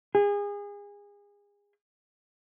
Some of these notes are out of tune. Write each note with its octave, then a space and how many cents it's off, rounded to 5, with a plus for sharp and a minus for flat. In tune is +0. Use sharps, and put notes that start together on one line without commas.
G#4 -30